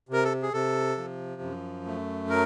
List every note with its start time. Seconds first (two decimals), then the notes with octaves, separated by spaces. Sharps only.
0.09 C3 A#4
0.24 A4
0.43 G#4
0.53 C3 A4
0.98 F3
1.41 F#2
1.86 A3
2.30 F#3 A#4